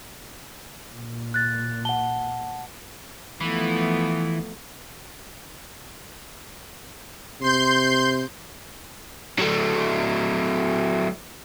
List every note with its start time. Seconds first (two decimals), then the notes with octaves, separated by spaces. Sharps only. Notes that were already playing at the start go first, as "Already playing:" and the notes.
0.93 A#2
1.34 F#6 A6
1.85 F#5 A5 G7
3.41 E3 F3 A3 B3
7.41 C3 C6 G6
9.39 F#3 A3